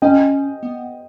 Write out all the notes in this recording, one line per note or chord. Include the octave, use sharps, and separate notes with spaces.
C#4 D#5 G5
B3